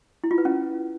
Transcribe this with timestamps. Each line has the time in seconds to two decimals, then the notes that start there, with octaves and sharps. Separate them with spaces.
0.24 E4
0.31 F4
0.38 B4
0.45 C#4